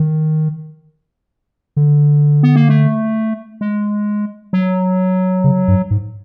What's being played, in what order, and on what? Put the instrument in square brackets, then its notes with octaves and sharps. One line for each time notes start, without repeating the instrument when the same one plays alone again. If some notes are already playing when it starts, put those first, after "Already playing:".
Already playing: [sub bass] D#3
D3
[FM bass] B3
A#3
A3
G#3
F#3
[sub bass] C#3
G2
G#2